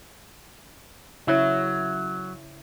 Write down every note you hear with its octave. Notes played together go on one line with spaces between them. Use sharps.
C#3 F#3 E4 C#5